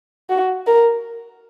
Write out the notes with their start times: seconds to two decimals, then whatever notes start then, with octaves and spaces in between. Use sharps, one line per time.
0.30 F#4
0.67 A#4